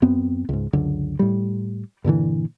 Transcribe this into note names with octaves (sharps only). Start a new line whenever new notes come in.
F#2 B3 C4
C#2 G#2
C#2 F#2 D3
A2 G3
G2 A#2 D3 E3